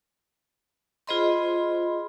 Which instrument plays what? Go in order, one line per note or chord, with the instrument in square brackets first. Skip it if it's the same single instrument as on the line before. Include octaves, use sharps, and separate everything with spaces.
[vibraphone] F4 G#4 C5 D#5 B5 C6